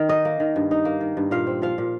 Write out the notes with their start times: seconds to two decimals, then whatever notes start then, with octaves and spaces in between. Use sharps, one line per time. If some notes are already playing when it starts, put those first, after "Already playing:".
Already playing: D#3
0.09 D#4 D#5
0.25 A#3
0.40 D#3
0.56 G2
0.71 D#4
0.85 A#3
1.01 D#3
1.17 G2
1.31 A#2 F5
1.47 C4
1.62 F3 F5
1.78 A#2